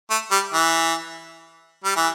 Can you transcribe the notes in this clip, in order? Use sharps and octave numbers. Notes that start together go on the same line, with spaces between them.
A3
G3
E3
G3
E3